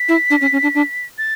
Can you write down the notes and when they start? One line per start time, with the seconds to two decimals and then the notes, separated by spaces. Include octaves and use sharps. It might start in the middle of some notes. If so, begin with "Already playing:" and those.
Already playing: B6
0.09 E4
0.30 D4
0.41 C#4
0.52 C#4
0.63 D4
0.75 D4
1.18 A6